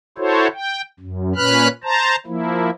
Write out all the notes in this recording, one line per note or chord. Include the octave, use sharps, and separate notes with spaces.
E4 F#4 A4 C5 C#5
G5
F#2
A#2 C#4 B4 B5 F6 F#6
C5 A5 A#5
F3 A#3 E4